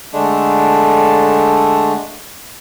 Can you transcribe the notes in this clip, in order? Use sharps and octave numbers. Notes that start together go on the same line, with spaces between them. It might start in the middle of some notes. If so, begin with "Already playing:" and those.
D3 G#3 A3 D4